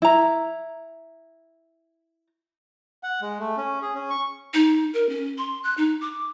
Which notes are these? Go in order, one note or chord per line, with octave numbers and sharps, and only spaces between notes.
E4 A#5
F#5
G#3
A3
C#4
G#4
C#4
C#6
D#4
A#4
C#4
C6
F#6
D#4
D6